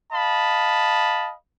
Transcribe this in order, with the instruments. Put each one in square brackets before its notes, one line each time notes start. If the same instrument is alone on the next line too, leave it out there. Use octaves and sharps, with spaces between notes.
[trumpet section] D#5 F5 A5 B5